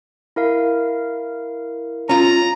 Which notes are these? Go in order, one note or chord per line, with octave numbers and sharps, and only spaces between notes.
E4 A#4 F5
C#4 F4 A#5